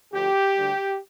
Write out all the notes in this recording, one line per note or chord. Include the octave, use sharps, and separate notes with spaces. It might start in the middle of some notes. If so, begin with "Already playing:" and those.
D2 D3 F3 G4
D2 D3 G3